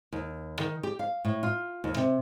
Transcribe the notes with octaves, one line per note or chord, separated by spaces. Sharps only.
D#2
D#3
G4
F5
A2
F4
D#2
C3